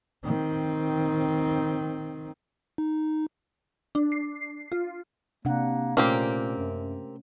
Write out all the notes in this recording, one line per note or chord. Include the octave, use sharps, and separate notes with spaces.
D#3 C4
D#4
D4
C7
F4
C3 A#3 D4 F#5
A#2 A3 A#3 C4 C#4 G4
F#2